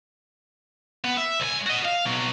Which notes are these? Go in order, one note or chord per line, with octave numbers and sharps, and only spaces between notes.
B3
E5
C2 G#5
F#4 D#5
F5
B2 F#3